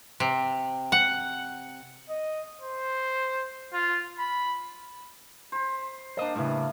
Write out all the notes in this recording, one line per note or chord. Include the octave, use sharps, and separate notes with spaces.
C3
F#5
D#5
C5
F4
B5
C5 B5
A#3 D4 C5 D#5
A2 C#3 E3 G3